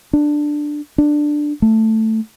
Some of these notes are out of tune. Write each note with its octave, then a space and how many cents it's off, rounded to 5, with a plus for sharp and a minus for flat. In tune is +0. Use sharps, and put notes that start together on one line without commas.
D4 +10
D4 +10
A3 +5